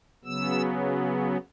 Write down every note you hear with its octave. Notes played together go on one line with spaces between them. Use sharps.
C#3 F#3 B3 E6